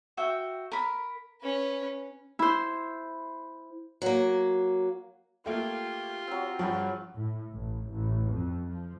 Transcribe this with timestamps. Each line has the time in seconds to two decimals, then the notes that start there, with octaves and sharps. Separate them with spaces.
0.17 F#4 E5 G5
0.72 A#4 B5
1.42 C#4 B4
2.39 E4 C5
4.02 F#3 A#3
5.46 A3 A#3 F4 G4 G5
6.27 F#3 C4
6.59 G2 C#3 F3 F#3 C#6
7.15 A2
7.52 A1
7.89 A1
8.30 F2
8.67 F3